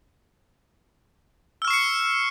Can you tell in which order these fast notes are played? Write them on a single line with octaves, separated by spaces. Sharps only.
E6 F6 C#6 C7 C#7